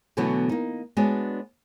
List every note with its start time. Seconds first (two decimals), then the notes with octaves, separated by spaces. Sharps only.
0.17 B2 D3 E3 F#3 A3 B3
0.49 A#3 D#4
0.97 G#3 B3 D4 F#4 C#5 D5